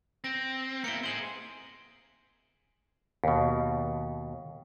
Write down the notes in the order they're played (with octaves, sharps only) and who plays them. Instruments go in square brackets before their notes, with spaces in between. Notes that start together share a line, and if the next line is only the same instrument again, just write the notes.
[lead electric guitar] C4 [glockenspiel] A#6 D7
[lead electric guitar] A#3 E4 [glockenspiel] C#7 D7 G7
[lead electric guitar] G#4 C5 [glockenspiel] D7 F#7
[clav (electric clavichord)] D#2 B2